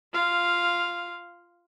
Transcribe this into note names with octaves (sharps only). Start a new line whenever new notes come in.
F4 F5